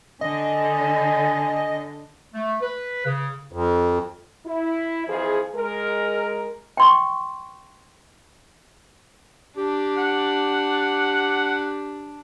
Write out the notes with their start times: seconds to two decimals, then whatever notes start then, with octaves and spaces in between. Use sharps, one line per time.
0.21 D3 D#5 G#5
2.34 A3
2.61 B4
3.06 C#3
3.52 F2
4.46 E4
5.08 F2 E3 F3 G#4
5.54 G#3 A#4
6.77 G5 C6 C#6
9.58 D4 G4
9.97 F#5